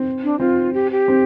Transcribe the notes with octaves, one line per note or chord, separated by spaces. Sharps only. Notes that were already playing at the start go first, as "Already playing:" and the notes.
Already playing: C4
D4
C4 F4
G4
G4
C4